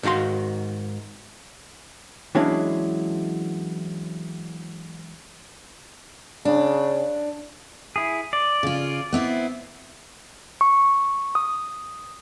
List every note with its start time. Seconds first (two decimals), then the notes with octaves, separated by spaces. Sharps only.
0.03 G#2 D#3 F#4 F5 C6
2.35 E3 F#3 G#3 C#4 D4 E4
6.45 C#3 D4
7.96 E4 G#4
8.33 D5
8.63 C#3 F4
9.13 B3 C4 E4
10.61 C#6
11.35 D#6